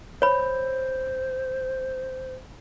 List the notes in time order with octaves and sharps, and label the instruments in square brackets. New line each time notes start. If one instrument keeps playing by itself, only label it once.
[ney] C5 [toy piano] C#5 B5